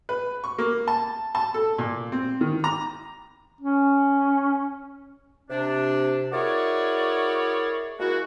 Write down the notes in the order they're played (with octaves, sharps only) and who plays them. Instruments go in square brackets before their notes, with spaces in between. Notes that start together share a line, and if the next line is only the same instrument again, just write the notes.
[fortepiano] B4
C#6
A#3
A5
A5
A4
A#2
C4
D#3
A#5
[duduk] C#4
[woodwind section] C3 D4
E4 F#4 G#4 A#4 C#5 D5
G#3 A#3 E4 F#4